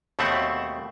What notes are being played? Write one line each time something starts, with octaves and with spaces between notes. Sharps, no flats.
D#2 B2 A3 C4 E5 F#5